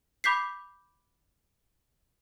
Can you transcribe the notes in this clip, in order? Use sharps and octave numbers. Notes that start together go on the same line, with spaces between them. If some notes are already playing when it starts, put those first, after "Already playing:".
B5 D6 G6 B6 C7